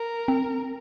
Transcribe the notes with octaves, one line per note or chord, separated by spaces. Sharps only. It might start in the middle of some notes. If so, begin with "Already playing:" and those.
Already playing: A#4
C4